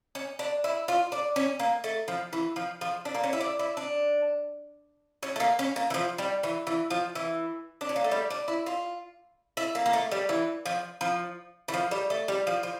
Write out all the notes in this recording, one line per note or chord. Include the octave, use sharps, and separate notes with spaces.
C#4
D4
E4
F4
D4
C#4
A#3
A3
F3
E3
F3
F3
D4
A#3
C#4
E4
D4
E4
D4
C#4
A3
A#3
C#4
A#3
E3
F3
G3
E3
E3
F3
E3
D4
C#4
A#3
A3
G3
D4
E4
F4
E4
A#3
A#3
A3
G3
E3
F3
F3
E3
F3
G3
A3
G3
F3
F3